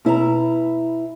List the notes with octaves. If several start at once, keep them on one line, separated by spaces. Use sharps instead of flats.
B2 E4 C#5 A#5